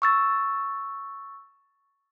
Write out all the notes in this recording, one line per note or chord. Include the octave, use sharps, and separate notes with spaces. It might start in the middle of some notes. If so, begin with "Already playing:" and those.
C#6 E6 A6